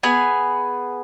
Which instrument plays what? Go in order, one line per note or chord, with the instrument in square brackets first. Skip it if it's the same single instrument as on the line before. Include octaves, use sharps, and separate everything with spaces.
[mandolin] B3 G#4 G#5